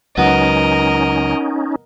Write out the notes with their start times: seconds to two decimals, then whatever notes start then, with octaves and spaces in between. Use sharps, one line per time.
0.17 C#2 F#3 B3 C#4 D#4 A#4 D#5